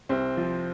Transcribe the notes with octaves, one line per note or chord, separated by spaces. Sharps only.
C2 C4
F3